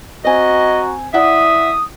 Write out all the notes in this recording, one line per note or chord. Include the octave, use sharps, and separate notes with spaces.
C4 F#4 D#5 G#5 A#5
E4 D5 E5 F#5 D#6